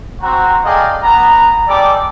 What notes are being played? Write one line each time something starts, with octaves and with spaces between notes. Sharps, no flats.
C4 F#4 A#5
G#4 A4 D5 D#5 F5 G5
B3 A#5
G3 G#3 A4 D5 G5 D6